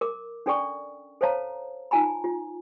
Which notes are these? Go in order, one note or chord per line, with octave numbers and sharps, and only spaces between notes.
A#4 D6
C#4 D4 A4 D5 G5 C#6
A4 C5 C#5 F5 A5 A#5
D#4 F4 G#5 A#5 B5
F4